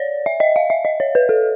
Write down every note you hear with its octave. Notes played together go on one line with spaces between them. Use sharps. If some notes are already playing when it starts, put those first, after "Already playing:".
Already playing: C#5 D5
E5
D#5
F5
E5
D#5
C#5
B4
A4